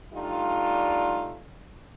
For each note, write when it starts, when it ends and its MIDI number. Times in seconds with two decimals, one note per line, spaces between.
0.13 1.40 55
0.13 1.40 57
0.13 1.40 62
0.13 1.40 63
0.13 1.40 65